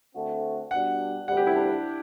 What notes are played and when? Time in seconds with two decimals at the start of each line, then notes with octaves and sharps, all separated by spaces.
0.14 D3 A3 C4 F#4 A4
0.71 B2 G3 D4 F#5
1.28 D2 C3 E3 G3 F#5
1.37 G4
1.47 E4
1.56 D4